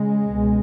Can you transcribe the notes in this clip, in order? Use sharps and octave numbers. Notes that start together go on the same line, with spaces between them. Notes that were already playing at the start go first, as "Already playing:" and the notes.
Already playing: C#3 G#3
C#2 B2